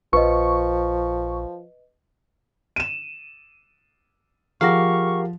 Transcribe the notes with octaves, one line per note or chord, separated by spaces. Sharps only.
A#1 F3 B4 D#5 C#6
D#7 E7
F3 G4 G#4 A#4 F5 F#5 C#6 A#6